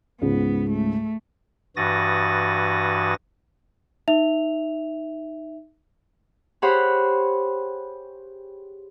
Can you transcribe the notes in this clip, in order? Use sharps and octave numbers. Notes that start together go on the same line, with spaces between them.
C#2 G#2 C#3 B3
A3
G2 E3 F#4 D#6 A6 A#6
D#4 E5 F7
G4 G#4 C5 C#5 F#5 B5